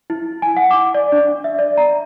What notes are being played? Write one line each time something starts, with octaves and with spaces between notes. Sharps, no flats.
E4
G#5
F#5
D6
D5
D4
E5
D5
A#5